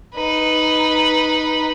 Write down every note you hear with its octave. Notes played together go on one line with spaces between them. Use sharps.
D#4 B4